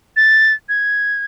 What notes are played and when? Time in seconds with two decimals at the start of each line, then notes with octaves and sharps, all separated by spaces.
0.17 A6
0.69 G#6